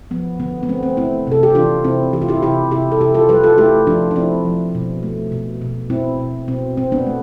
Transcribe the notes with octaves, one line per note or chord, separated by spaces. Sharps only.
F3 B3
D3 B3
B3
A3 C4
C4
A3 C4 E4
C3 A4
G4
E3 D4 F4
C3 C4 E4
E3 G4
F4
E4 G4
C3 E4 G4
C3 E4 G4
A4
C3 E4 G4
F4 A4
G3 G4 B4
F4 A4
A3 E4 G4
F3 D4 F4
D4
F3 C4 E4
F3
B2
A3
B2
B2
B2 C4 E4
B2
B2 C4
B2 C4
B3 D4
A3